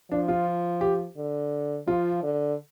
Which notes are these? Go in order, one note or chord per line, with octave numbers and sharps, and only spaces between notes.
F3 D4
F4
G4
D3
F3 F4
D3